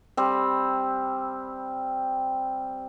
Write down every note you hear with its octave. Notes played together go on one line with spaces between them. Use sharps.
G3 C4